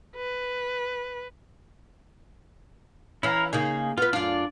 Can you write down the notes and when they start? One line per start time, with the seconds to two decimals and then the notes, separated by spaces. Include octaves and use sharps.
0.16 B4
3.23 E3 C#4 E4 F5 A#5
3.53 C#3 A#3 D#4 G#4
3.98 B3 F4 B4
4.13 F#2 D4 F4 D5